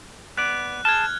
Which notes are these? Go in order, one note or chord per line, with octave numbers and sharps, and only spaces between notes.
B3 D5 F#6
G#4 A5 F6 G#6